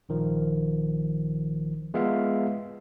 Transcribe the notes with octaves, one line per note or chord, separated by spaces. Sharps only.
A#1 D#3 F3
G#3 B3 F4 E5 F5